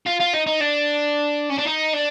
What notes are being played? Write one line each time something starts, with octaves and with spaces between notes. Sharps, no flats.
F4
F4
D#4
D#4
D4
C#4
D4
D#4
D4